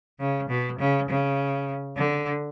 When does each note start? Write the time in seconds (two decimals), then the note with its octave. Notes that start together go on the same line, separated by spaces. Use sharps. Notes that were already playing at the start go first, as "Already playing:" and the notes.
0.20 C#3
0.49 B2
0.79 C#3
1.09 C#3
1.97 D3